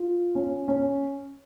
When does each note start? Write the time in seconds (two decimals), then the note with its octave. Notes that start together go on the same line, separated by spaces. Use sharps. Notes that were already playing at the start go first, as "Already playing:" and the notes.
Already playing: F4
0.35 C#4
0.68 C#4